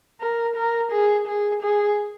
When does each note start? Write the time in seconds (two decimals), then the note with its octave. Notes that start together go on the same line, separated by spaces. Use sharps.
0.21 A#4
0.56 A#4
0.91 G#4
1.28 G#4
1.63 G#4